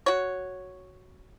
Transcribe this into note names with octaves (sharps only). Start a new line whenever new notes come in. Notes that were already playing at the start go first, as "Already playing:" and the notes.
F#4 C#5